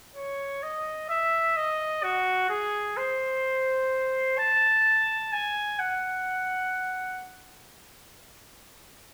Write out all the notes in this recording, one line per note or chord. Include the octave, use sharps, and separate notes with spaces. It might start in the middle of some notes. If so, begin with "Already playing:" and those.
C#5
D#5
E5
D#5
F#4
G#4
C5
A5
G#5
F#5